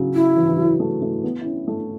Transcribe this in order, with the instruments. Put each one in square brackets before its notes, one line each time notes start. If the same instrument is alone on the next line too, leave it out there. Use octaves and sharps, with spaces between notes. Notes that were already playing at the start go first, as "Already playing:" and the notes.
Already playing: [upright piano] C#3 F#3
[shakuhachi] E4
[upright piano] E3
E3
F#3
A3
A3
B3
E4
C#4
A3